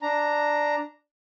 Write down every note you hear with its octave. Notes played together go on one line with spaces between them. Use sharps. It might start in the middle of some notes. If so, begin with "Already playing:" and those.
D4 A#5